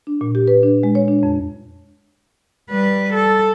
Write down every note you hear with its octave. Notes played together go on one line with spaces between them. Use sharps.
D4
A#2
G4
B4
D4
G#3
C#5
D4
F2
G3 B4
A4